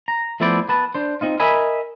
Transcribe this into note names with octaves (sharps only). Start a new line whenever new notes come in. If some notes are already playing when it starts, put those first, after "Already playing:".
A#5
F3 A3 B3 E4 C5 D5
B3 B4 A5
D4 C5
C4 D#4 F4
A#4 D#5 E5 G#5 B5